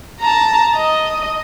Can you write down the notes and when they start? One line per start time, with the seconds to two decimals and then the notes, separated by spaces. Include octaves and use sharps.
0.21 A5 A#5
0.76 D#5